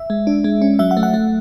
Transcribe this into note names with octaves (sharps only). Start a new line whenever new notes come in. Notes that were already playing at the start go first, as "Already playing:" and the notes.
Already playing: E5
G#3
D4
G#3
C#4
F#3 E5
F#5
A3
F#5
A3